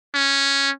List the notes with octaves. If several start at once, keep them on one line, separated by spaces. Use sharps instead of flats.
C#4